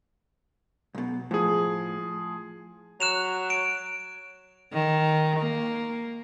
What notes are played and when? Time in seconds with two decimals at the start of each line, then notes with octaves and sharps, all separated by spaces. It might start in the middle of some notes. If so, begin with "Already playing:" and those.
0.95 B1 B2
1.31 A2 F3 G#4
3.00 F#3 F#6 E7 F7
3.50 D7
4.73 D#3
5.39 A#3